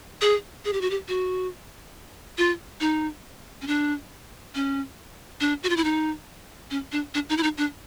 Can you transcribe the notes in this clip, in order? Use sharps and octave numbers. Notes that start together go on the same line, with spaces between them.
G#4
G#4
G4
F#4
G4
F#4
F4
D#4
C#4
D4
C#4
D4
F#4
F4
E4
D#4
C#4
D4
D4
D#4
E4
D#4
D4